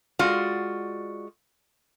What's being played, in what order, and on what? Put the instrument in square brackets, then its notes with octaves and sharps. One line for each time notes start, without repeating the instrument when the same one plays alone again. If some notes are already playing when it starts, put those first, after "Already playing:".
[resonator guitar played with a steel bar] G#3 F4 F#4 D5